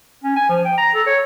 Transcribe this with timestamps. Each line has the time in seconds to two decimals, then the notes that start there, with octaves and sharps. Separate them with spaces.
0.24 C#4
0.36 G#5
0.49 F3
0.64 G5
0.77 A#5
0.94 A4
1.07 C#5